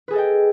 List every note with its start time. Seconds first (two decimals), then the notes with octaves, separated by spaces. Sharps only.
0.08 B4
0.11 G#4
0.13 A4
0.16 D#5
0.18 G5